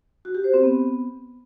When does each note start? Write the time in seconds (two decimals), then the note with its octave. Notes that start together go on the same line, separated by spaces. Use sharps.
0.25 F#4
0.35 G4
0.44 C5
0.54 C4
0.63 B3